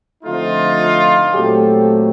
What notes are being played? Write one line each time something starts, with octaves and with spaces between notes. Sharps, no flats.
D3 F3 A3 C4 D#4 F4
A#2 F#3 A3 C4 G4 A4